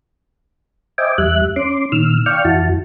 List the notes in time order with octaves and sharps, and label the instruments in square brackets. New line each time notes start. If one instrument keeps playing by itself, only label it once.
[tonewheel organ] C5 D#5 E5 G5 G#5 D6
E2 G3 E5 F#6
C#4 C6 D6
A#2 D#3 E6 F6
D5 F5 G5 C#6 F6
F2 E3 E4 F#4 A5